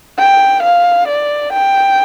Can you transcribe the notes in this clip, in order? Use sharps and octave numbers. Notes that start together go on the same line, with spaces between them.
G5
F5
D5
G5